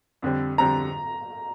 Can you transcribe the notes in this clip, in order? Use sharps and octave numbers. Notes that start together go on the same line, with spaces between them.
F2 D3 G3 C4
F2 D3 G3 C4 A#5